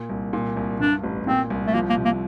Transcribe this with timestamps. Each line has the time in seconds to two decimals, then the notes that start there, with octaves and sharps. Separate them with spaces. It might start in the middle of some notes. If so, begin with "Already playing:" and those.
Already playing: A#2
0.10 C2
0.33 A#2
0.57 C2
0.80 G2 D4
1.04 A1
1.27 A#2 C4
1.50 C2
1.67 A3
1.74 F3 A#3
1.90 A#3
1.98 C3
2.05 A#3